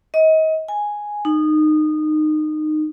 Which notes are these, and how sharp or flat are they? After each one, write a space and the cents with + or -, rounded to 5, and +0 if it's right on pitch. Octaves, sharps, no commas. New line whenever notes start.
D#5 +30
G#5 +0
D#4 -20